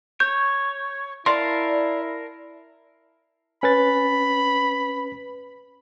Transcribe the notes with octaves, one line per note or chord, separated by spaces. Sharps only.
C#5 G6
E4 A#4 D5 F5 A5 C6
C#4 B4 B5 A6